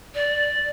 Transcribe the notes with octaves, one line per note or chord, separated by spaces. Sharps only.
D5